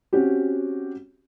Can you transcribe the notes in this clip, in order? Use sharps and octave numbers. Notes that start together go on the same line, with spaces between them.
C4 C#4 F#4 G4